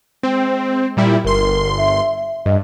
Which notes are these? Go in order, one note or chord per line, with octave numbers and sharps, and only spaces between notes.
G#3 C4
A#2 G3 E4
G1 A#4 C6
E5
G2 D#5